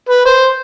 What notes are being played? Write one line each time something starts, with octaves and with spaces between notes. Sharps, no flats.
B4
C5